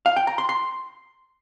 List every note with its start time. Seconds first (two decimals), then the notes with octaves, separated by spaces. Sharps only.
0.06 F5
0.16 G5
0.27 A#5
0.38 C6
0.49 C6